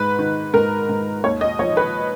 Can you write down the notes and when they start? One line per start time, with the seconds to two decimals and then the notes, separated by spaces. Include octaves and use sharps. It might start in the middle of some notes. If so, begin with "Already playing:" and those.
Already playing: G#2 B4
0.19 D#3
0.54 G#2 A#4
0.89 G#2
1.24 D#2 C#5
1.41 D#5
1.59 F3 C#5
1.77 B4